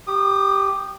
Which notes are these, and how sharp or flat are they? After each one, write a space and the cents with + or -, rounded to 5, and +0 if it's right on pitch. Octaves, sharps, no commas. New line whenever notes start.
G4 +0 D#6 -30